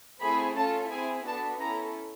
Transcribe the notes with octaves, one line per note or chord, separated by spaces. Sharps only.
A3 C4 E4 G#4 B5
C#4 F4 A4 A5
C4 E4 G#4 G#5
B3 D4 F#4 A4 A5
C#4 E4 A4 A#5